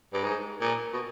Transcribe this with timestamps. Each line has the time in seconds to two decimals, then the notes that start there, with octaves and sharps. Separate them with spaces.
0.13 G2
0.23 G#2
0.61 A#2
0.93 B2